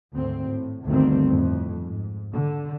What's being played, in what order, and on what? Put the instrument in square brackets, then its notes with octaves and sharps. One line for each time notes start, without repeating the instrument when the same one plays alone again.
[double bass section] G#1 D2 C4
A2
G1 D2 D3 D#3 G3 C4
F2 A2
G#2
D3